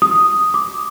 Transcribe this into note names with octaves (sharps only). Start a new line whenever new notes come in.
D#6
D6